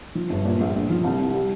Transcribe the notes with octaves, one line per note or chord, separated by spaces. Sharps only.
F3
G1
A#2
A#1
A#1
F3
C2
C2
G3